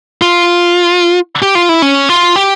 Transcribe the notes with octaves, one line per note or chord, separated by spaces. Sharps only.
F4
G4
F4
E4
C#4
F4
G4